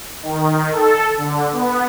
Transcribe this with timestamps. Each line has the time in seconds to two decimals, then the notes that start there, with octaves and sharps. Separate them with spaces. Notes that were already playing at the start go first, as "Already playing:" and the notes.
0.23 D#3
0.71 A4
1.18 D3
1.52 B3